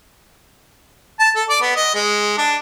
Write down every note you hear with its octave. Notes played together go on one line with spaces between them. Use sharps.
A5
A4
D5
B3
D#5
G#3
D4